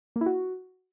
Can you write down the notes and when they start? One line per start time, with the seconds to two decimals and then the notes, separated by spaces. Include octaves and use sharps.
0.16 A#3
0.21 E4
0.26 F#4